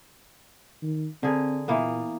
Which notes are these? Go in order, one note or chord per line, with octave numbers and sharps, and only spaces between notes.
D#3
D3 C4 G#4 A#4
A#2 E3 A#3 B3